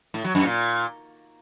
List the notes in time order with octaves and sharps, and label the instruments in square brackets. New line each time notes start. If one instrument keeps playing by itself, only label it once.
[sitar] A2
F#3
F#2
A#2